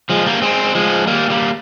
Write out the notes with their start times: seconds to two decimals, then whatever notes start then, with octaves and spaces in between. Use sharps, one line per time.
0.09 F3 G#3
0.26 G3 A#3
0.42 G#3 C4
0.75 F3 G#3
1.07 G3 A#3
1.30 G3 A#3